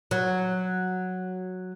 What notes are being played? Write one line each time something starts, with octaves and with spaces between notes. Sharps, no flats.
F#3